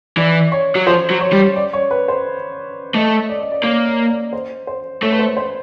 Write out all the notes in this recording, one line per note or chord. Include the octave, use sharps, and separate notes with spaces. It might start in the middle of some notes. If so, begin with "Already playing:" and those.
E3 D5
C#5
F#3
F3 C5
F#3
C#5
G3
D5
C#5
B4
C5
A3 D#5
D5
D#5
D5
A#3 C#5
C#5
D5
C5
C5
A3 C#5
B4
C5
C5